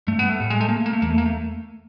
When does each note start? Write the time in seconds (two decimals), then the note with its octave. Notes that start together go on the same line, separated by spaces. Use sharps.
0.07 G2 A3
0.19 B3
0.29 A3
0.40 A2 G3
0.50 G#3
0.61 A3
0.69 A#3
0.77 A3
0.86 A#3
0.93 A3
1.02 E2 A#3
1.10 A3
1.18 A#3
1.26 A3